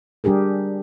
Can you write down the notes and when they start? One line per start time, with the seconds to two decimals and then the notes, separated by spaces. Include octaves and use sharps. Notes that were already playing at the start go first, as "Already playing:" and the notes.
0.24 G3 D4 G4 G#4 A#4